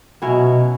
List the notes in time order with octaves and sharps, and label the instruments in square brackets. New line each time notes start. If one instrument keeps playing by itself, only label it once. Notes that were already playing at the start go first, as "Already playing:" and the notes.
[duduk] B2 [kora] F#3 C#4 E4